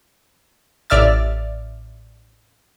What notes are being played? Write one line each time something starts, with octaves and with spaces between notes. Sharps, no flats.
A1 D5 E5 F6 A6